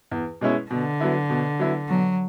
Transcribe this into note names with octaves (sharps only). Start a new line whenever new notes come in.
E2
B2 G#3 C#4 E4
B2 D3
F#3 B3 E4
B2
F#3 B3 E4
B2 F#3